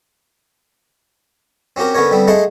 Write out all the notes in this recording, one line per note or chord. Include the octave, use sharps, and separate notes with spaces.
C4 C#4 F#4 G4 A#4
D3 B3 C#4 A#4 C#5
D3 G3 B3 C4
G#3 A3 D#4 F#5 A5 C6